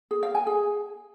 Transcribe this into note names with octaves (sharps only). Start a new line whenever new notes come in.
G#4
F5
G#5
G#4